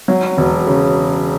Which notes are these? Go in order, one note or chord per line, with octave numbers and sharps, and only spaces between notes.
F#3
E1
C#3